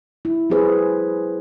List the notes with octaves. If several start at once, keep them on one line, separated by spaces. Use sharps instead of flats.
E4
F#3 C4 G4 G#4 B4 C5